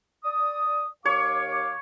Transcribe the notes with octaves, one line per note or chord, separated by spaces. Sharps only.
D5 D#6
D#2 C#5 F5 D6